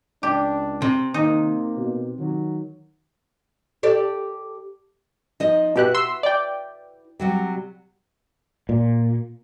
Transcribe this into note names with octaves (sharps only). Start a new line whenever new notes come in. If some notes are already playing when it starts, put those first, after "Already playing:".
C#2 D4 G4
C3
D#3 A#3 D#4
B2
D#3 F#3
G4 A4 D5
F3 D#4 D#5
B2 E4 F#4 G4 B4 F#6
C6 E6
D5 G5
C3 F#3 G3
A#2